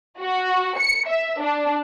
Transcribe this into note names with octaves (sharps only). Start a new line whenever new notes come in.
F#4
C#7
E5
D4